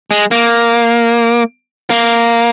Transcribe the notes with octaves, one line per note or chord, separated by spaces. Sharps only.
G#3
A#3
A#3